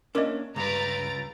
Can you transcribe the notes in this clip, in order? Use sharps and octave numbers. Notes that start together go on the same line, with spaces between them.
A#3 C#4 D4 A#4 D#5
C#2 G2 B4 A#5 A6 D7